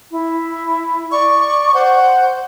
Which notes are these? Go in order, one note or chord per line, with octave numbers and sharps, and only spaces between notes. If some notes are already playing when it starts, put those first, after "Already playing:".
E4
D5 C#6
C5 F#5